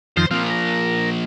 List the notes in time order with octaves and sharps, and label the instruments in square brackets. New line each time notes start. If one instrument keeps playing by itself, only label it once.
[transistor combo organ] F2 D#3 F3 [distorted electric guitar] C5
[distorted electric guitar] F3 A#3 [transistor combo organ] C4 F6
[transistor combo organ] A#4